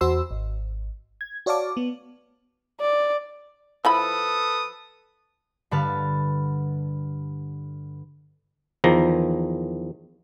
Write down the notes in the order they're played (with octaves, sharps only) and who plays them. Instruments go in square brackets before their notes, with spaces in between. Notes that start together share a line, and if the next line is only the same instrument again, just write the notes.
[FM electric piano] E2 F#4 C5 C6 E6
G#1
G#6
F#4 C#5 D5 F5 A5 D6
B3
[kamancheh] D5
[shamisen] F3 E4 B5 [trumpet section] A4 B4 D#6
[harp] G2 D3 B4 A5 F6
[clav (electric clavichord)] E2 D#3 F3 A#5